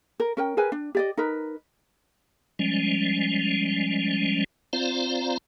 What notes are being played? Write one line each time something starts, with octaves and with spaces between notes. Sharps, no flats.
A#4
C#4 A#4 G5
G#4 A#4 B4 G#5
D4
G4 D5 D#5
D#4 A#4 B4
F3 G3 G#3 C#4
C4 F4 C5 D5 F5 A#5